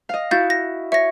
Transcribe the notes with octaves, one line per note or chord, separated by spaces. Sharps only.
D#5 F5
E4 F#4 F5 G6 A6
A#6
C#5 E5 A#6